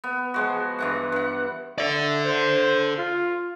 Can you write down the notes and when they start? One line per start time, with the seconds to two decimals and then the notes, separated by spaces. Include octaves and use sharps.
0.04 B3
0.34 F3 G#3 F#4
0.79 G2 E3 F#5
1.12 G2 F#5
1.78 A4 D5 E5
2.25 C5
2.98 F4